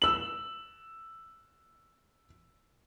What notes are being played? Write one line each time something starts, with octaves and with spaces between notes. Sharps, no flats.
E6 F#7